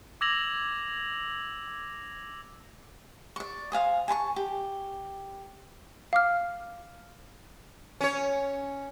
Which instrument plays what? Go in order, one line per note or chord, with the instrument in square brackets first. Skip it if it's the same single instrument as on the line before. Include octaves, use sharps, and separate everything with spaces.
[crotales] D6 E6 G#6 A#6 F7 F#7
[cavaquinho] D5 C#6
C5 F5 G#5 D#6
G#5 A5 B5 C#6
G4
[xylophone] F5 D6 F6
[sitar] C#4 C#5